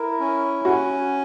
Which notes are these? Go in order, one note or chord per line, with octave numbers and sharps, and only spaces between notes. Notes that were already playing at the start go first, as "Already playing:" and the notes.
Already playing: E4 A#4
C#4
C#4 F#4